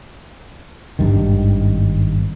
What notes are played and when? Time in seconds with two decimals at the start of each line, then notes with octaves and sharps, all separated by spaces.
0.99 G#1 G2 D#3